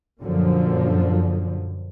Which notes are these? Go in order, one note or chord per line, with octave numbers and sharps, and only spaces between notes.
F#2 A#2 D3 F3